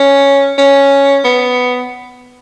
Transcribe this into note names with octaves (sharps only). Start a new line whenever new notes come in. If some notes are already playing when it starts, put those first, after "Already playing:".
Already playing: C#4
C#4
B3